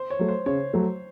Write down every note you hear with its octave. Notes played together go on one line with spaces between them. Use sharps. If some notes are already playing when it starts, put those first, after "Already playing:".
Already playing: C5
C#5
F#3 A3
C5
C#3 C#5
F#3 A3